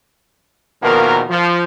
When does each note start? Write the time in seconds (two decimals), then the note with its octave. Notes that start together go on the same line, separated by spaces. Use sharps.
0.82 E2 B2 D#3 F3 A#3 A#4
1.29 F3